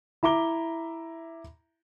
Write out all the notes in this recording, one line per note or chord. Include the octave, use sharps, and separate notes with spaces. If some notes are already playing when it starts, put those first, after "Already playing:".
E4 E5 A#5 D6 G7